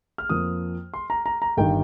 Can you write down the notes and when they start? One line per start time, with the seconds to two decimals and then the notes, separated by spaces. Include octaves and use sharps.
0.18 F6
0.29 F2 F3 A#3 D#6
0.94 C6
1.10 A#5
1.26 A#5
1.42 A#5
1.57 G1 G2 D#3 G3 D#4 G5